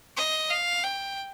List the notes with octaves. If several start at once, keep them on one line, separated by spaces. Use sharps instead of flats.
D#5
F5
G5